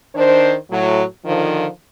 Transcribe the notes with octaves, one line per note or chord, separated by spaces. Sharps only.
D#3 D4 C5
A2 F#3
D3 D#3 F3